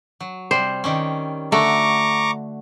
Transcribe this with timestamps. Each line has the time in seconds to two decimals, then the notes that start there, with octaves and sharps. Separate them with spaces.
0.20 F#3
0.51 C3 G3 C5
0.84 D#3 G3 C#4
1.52 D3 A3 F#4 A#5 C#6 D6